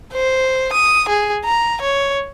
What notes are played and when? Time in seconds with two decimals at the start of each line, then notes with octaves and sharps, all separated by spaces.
0.13 C5
0.73 D#6
1.08 G#4
1.45 A#5
1.81 C#5